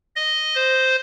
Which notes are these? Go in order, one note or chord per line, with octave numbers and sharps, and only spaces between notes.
D#5
C5